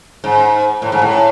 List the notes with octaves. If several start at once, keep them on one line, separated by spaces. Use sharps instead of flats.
G#2
A2
G#2
A2